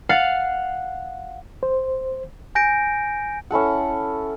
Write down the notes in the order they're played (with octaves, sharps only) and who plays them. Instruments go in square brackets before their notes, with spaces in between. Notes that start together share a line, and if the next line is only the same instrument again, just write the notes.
[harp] F5 F#5 A6 C7
[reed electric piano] C5
[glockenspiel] G#5 G6 A#6 D7
[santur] C#4 E4 A4 F#5